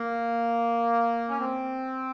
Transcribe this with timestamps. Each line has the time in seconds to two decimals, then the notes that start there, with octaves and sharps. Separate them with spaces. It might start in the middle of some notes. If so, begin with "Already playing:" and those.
Already playing: A#3
1.29 C#4
1.39 C4